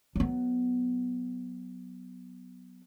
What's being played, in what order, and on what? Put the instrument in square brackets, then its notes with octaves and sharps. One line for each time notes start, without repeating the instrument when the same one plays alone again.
[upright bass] F#3 B3